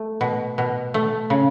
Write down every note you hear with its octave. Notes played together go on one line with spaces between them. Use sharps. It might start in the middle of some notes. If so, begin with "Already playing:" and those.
Already playing: A3
B2
B2
A3
C#3